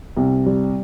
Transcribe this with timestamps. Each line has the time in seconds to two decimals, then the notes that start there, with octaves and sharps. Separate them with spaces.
0.16 C2
0.46 G3